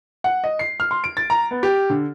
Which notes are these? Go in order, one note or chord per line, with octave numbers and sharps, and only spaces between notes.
F#5
D#5
C7
F6
C6
D7
A6
A#5
B3
G4
D3